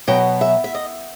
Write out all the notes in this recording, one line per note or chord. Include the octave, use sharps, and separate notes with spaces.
B2 F#3 B3 G5
E5
E5
D#5